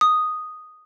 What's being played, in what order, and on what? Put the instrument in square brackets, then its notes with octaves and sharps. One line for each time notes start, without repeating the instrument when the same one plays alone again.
[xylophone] D#6